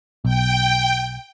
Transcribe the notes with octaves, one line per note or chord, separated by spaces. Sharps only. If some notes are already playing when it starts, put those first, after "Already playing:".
B1 G5